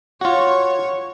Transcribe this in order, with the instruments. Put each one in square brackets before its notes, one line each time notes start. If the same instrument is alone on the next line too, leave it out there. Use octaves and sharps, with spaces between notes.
[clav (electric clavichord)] F4 F#4 [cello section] C#5